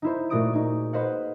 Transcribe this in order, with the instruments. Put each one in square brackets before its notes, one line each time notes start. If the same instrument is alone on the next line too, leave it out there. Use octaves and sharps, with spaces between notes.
[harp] D#4 E4 C5
A#2 A3 F#4 A#4 D#6 D7
D#4 G#4
B4 C5 D#5 F5 F#5